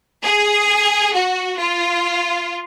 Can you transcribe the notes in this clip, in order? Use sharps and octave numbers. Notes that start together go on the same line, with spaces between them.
G#4
F#4
F4